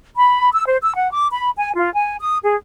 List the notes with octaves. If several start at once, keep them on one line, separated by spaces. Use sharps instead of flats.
B5
E6
C5
E6
F#5
D6
B5
G#5
F4
G#5
D#6
G#4